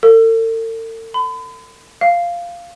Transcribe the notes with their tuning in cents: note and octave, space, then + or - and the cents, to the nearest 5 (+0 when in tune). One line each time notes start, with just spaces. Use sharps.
A4 +45
B5 +40
F5 -5